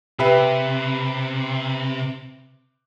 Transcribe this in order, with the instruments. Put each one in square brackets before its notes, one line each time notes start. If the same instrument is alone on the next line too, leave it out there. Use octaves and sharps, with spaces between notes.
[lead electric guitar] C3 [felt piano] G4 B4 E5